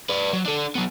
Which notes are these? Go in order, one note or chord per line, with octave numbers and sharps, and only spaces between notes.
B4 D5
F#3
D4 A4
F#3 B3